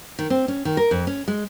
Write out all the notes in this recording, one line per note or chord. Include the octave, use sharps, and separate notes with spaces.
D#3
C4
C#4
D#3
A#4
F2
C#4
G#3